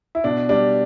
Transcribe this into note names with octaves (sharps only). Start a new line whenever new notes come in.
E4
B2 D4
G3 D4